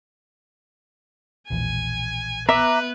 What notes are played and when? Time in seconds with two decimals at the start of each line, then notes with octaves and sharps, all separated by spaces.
1.50 E1 A#1 E2 G#5
2.49 B3 B4 E5 A#5 D6